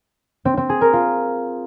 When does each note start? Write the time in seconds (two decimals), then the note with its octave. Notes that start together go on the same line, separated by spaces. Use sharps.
0.45 C4
0.57 C4
0.69 G#4
0.81 A#4
0.93 F4